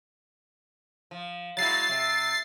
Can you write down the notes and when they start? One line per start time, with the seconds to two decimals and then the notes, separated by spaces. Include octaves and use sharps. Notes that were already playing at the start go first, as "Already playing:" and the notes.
1.11 F3
1.57 F#3 G#3 E4 A6 C7
1.90 C3